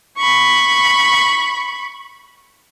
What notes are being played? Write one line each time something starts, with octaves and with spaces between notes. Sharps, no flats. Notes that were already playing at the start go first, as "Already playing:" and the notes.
B5 C#6